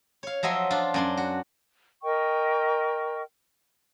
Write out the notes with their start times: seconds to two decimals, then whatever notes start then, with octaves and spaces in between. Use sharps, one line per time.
0.23 C#5 F5
0.43 F3 F#3 D#5 E5 C6
0.71 D4 F4
0.94 F#2 D4 C6
1.17 F#4
2.03 A#4 D#5 G5 C#6